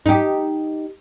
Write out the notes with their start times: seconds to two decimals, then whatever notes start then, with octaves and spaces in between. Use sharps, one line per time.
0.06 D#4 G4